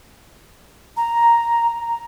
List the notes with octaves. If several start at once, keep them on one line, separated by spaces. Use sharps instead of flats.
A#5